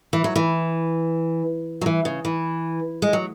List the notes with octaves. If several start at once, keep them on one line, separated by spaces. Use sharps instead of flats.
E3
F#3
E3
F#3
E3
C#3
E3
G#3
F#3